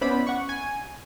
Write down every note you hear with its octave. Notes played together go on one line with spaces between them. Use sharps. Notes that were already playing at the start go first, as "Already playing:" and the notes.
B3 C#4 E4 C5 D5 B5
F#5 C#6
G#5